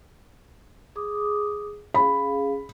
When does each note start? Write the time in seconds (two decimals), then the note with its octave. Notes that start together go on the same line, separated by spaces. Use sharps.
0.96 G#4 D6 D#6
1.94 C#4 G#4 F5 B5